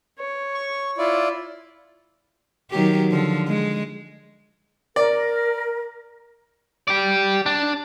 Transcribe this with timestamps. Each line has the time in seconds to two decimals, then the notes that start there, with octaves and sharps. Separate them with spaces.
0.19 C#5
0.54 C#6
0.98 E4 F4 D5
2.71 D#3 F#3 G4
3.11 D3 F3
3.48 G#3
4.96 A#4 D5
6.88 G4 D5
7.46 D4